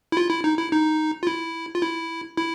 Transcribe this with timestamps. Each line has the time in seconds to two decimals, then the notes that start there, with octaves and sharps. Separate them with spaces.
0.12 E4
0.17 F4
0.30 E4
0.44 D#4
0.58 E4
0.72 D#4
1.23 F4
1.27 E4
1.75 F4
1.82 E4
2.37 E4